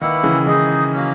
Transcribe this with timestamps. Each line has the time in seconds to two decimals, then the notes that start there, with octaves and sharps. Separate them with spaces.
0.01 D#3 A#3 E4 B4 F#5
0.23 C#3 E3
0.47 E3 G#3 D#4 G#4 D#5
0.94 F#3 A#3 C#4